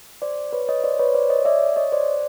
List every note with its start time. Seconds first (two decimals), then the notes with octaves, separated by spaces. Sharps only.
0.22 C5 D5
0.53 B4 C#5
0.69 C#5 D#5
0.84 C5 D5
0.99 B4 C#5
1.15 C5 D5
1.30 C#5 D#5
1.45 D5 E5
1.76 C#5 D#5
1.92 C5 D5